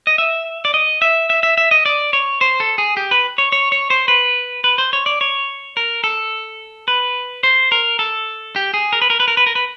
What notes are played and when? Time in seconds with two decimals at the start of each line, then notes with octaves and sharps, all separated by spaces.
0.07 D#5
0.18 E5
0.65 D5
0.74 D#5
1.02 E5
1.30 E5
1.43 E5
1.58 E5
1.71 D#5
1.86 D5
2.13 C#5
2.41 C5
2.60 A4
2.78 G#4
2.97 G4
3.11 B4
3.38 C#5
3.52 C#5
3.72 C#5
3.90 C5
4.08 B4
4.64 B4
4.78 C5
4.93 C#5
5.06 D5
5.21 C#5
5.77 A#4
6.04 A4
6.88 B4
7.43 C5
7.72 A#4
7.99 A4
8.56 G4
8.74 G#4
8.93 A#4
9.02 B4
9.10 A#4
9.20 B4
9.28 A#4
9.37 B4
9.47 A#4
9.55 B4